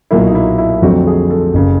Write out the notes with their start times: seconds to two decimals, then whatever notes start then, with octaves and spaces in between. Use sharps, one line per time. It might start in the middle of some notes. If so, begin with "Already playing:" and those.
0.11 B1 A#2 F#3 A#3 E4
0.27 D#4
0.35 E4
0.58 E4
0.82 F2 D3 F#3 A3 C4 F#4
1.07 G#4
1.30 A4
1.54 F#1 C#3